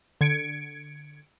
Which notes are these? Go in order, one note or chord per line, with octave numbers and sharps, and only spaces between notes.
D3 G#6 C#7 D7